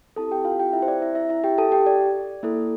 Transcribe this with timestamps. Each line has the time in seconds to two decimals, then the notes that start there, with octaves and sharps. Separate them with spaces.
0.16 C4 E4 G4 A4 A5
0.31 G4 G5
0.45 F4 F5
0.60 G4 G5
0.73 E4 E5
0.82 C5
0.88 D5
1.02 E4 E5
1.15 E4 E5
1.29 E4 E5
1.44 G4 G5
1.58 A4 A5
1.72 G4 G5
1.86 D5
2.43 A#3 E4 A4